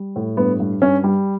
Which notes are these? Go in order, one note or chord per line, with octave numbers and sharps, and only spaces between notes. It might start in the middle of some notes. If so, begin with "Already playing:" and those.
Already playing: G3
A2
G2 B3
G2
G2 C#4
G3